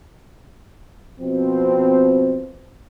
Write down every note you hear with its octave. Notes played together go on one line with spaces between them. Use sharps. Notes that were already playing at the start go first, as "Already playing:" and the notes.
B2 F3 C4